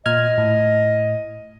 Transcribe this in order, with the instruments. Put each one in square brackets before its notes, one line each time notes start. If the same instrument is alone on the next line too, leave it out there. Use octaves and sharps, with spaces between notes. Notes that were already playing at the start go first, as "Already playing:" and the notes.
[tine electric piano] A#2 F6 G#6 [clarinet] D#5
[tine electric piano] A2